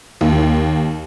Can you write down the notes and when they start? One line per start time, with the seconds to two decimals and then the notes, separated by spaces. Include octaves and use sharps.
0.21 D#2